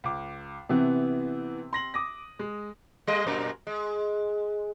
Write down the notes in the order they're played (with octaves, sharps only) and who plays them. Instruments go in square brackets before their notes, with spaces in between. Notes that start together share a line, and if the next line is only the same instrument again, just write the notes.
[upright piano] C#2 D6
[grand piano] C3 C4 [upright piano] E3 B3
[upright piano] C6 A#6 F#7
D6 D#6 A#6
G#3
[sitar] G3 D#5
F#2 A#2 A#4
G#3